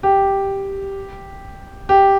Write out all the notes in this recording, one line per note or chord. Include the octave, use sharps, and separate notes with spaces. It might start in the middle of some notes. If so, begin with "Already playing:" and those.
G4
G4